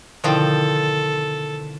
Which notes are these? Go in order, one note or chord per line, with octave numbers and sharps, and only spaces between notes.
B2 D3 D#3 F3 C4 E4 A4